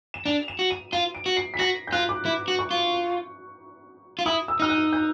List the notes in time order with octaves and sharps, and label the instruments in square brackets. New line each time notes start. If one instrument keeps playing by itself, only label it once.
[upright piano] E7
[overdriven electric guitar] D4 [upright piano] F7
[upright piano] E7
[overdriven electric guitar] F#4
[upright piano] D#7
[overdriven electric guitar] F4 [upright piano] D#7
[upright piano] D7
[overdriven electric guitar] F#4
[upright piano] C7
B6
[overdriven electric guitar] F#4 [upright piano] A#6
[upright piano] G6
[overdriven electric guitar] F4 [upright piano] F#6
[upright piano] D6
[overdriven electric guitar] E4
F#4
[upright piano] C#6
[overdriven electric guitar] F4
F4
[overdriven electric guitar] E4 [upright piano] D#6
[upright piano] E6
[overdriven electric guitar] D#4 [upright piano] F6
[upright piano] F#6
G6